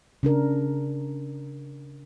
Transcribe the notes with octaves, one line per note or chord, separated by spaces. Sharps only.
C#3 D4 A#4